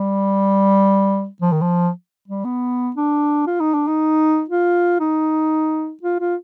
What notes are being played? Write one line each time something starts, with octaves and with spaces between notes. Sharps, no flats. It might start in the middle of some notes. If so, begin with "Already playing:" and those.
Already playing: G3
F3
D#3
F3
G3
B3
D4
F4
D#4
D4
D#4
F4
D#4
F4
F4